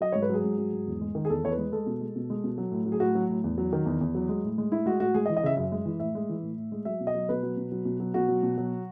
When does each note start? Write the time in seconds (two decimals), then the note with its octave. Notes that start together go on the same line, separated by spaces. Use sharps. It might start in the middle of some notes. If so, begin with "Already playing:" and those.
0.01 F#3 D#5
0.12 G#2 C#5
0.22 B4
0.29 F#3 G#4
0.44 G#2
0.58 F#3
0.73 G#2
0.87 E2
1.01 G#3
1.15 D#3
1.25 G#4
1.30 E2 A4
1.44 E2 C#5
1.51 B4
1.58 G#3
1.72 G#3 A4
1.87 B2
2.01 G#3
2.16 B2
2.30 G#3
2.44 B2
2.58 F#3
2.72 A2
2.86 F#3
2.92 G#4
3.00 A2 F#4
3.15 F#3
3.29 A2
3.44 E2
3.58 F#3
3.73 D#3
3.86 E2
4.01 E2
4.15 F#3
4.29 G#3
4.44 A2
4.58 G#3
4.72 A2 E4
4.86 G#3 F#4
5.00 A2 F#4
5.14 G#3 G#4
5.26 D#5
5.29 E3
5.37 D#5
5.43 C#3 E5
5.57 F#2 E5
5.72 G#3
5.85 E3
6.00 A2 E5
6.15 G#3
6.29 E3
6.42 A2
6.58 A2
6.72 G#3
6.85 F#3 E5
7.00 B2
7.07 D#5
7.15 F#3
7.29 B2 B4
7.43 F#3
7.57 B2
7.72 F#3
7.85 B2
8.00 F#3
8.14 B2 F#4
8.29 F#3
8.43 B2
8.58 F#3